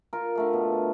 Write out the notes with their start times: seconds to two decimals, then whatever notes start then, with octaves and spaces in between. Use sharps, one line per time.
0.13 F4 A#4
0.35 D3 A3 F5
0.53 B2